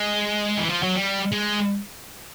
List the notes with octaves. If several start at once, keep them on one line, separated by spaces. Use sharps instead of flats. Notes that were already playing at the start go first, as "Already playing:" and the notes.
Already playing: G#3
E3
F3
F#3
G3
G#3